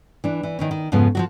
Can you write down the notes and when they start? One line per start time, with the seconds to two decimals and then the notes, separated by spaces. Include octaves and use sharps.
0.24 E3 D4
0.43 E3
0.59 D#3 E3 C#4
0.71 D#3
0.92 F2 G#2 C#3 F3 B3
1.15 F3 F#3 F#4